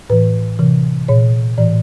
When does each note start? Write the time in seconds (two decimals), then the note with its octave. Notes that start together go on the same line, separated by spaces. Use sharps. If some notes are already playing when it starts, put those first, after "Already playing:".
0.10 A2 E3 B4
0.59 C3 E3
1.08 A#2 C#5
1.58 A2 E3 D5